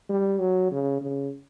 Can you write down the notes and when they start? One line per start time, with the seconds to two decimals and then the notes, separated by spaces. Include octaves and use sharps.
0.09 G3
0.40 F#3
0.71 C#3
1.01 C#3